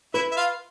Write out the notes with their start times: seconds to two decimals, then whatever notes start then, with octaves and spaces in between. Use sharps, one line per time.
0.14 E4 B4 E5
0.32 E5
0.37 F4 F5